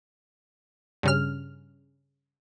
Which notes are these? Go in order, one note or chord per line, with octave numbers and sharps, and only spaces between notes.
G2 C#3 F6